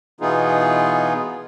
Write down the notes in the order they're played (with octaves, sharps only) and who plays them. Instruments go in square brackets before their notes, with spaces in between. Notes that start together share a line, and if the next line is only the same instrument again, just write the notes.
[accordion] B2 E3 B3 D#4 F4 G#4